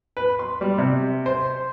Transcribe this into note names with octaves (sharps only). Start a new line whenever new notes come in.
B4
C6
G3
C3
C5